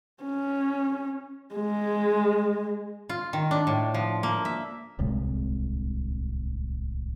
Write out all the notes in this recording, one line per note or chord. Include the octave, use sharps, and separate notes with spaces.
C#4
G#3
F4
D#3
D4
A2
F3
A#3
E5
D1 C2 C3 G#3